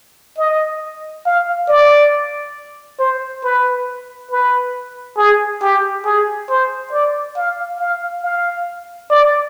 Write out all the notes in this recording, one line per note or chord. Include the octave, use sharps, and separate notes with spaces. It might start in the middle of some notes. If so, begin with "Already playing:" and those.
D#5
F5
D5
C5
B4
B4
G#4
G4
G#4
C5
D5
F5
F5
F5
D5